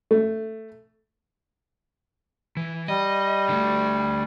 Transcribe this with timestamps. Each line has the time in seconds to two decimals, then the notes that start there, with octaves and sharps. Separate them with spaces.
0.11 A3
2.57 E3
2.88 G3 D#5
3.49 D3 A3